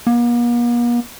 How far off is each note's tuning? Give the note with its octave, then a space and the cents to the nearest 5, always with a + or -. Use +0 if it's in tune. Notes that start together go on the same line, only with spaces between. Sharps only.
A#3 +45